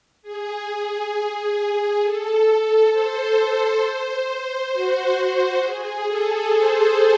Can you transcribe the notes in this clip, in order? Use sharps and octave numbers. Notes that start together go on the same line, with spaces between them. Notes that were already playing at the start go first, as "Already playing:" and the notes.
G#4
A4
C5
F#4
F#4
G#4
A4
C5